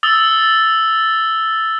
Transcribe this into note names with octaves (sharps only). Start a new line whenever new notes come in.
D#6 E6 A6 G7